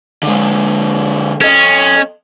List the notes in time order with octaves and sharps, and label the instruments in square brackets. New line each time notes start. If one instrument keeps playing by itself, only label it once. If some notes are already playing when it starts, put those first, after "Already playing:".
[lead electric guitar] D3 G#3
[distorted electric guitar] C#4 [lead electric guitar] A4 D#5